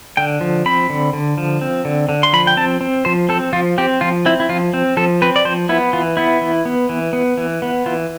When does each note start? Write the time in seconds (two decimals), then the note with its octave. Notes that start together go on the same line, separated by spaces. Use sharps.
0.17 D3 G5
0.41 F3
0.66 C4 B5
0.90 D3
1.13 D3
1.38 F3
1.61 C4
1.85 D3
2.09 D3
2.23 C6
2.33 F3 B5
2.47 G5
2.57 C4 A5
2.81 C4
3.05 F3 C5
3.29 C4 A4
3.53 F3 F4
3.78 C4 G4
4.01 F3 F4
4.26 C4 E4
4.40 E4
4.49 F3 F4
4.74 C4
4.97 F3 A4
5.22 C4 B4
5.36 D5
5.45 F3 C5
5.69 B3 E4
5.93 E3 F4
6.17 B3 E4
6.41 E3
6.65 B3
6.89 E3
7.13 B3
7.38 E3
7.62 B3
7.86 E3 F4